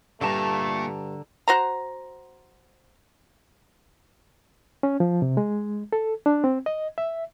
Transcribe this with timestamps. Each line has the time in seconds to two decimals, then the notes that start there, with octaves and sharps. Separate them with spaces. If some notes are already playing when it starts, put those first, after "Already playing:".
0.21 G2 A#2 D3 A3 A5 A#5
1.48 F#4 C5 A#5
4.83 C#4
5.00 F3
5.22 C3
5.37 G#3
5.93 A4
6.26 D4
6.44 C4
6.66 D#5
6.98 E5